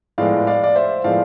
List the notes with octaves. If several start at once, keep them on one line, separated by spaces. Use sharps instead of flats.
A2 F3 G#3 B3 D5 F5
D5 F5
D5
C5 E5
A2 F3 G#3 B3 D5 F5